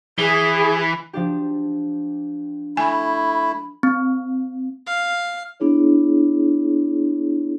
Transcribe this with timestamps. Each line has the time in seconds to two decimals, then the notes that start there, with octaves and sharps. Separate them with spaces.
0.19 E3 G#4
1.13 F3 D4 G4
2.77 A3 E4 G#5 B5
3.83 C4
4.86 F5
5.60 B3 D4 E4 G#4 C#5